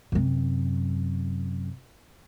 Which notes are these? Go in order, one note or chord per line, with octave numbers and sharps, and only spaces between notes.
F#2 C3